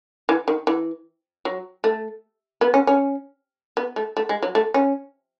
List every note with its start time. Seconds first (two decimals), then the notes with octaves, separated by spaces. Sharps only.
0.29 E3
0.48 D#3
0.67 E3
1.45 F#3
1.84 A3
2.61 B3
2.74 C#4
2.87 C#4
3.77 B3
3.96 A3
4.17 A3
4.29 G#3
4.43 F#3
4.55 A3
4.74 C#4